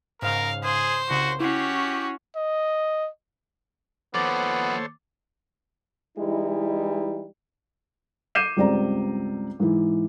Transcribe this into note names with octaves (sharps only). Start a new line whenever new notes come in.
G#2 C#3 A#4 F5
G#4 C5
C2 C#3 F#4
C#4 E4 F#4 G4 C7
D#5
D#2 F3 B3 A4 C5 C#5 D6 A6
E3 G3 G#3 D#4 E4
D6 G6 C7 D#7 E7
C#2 G2 C4 D5 A#5
G#2 E3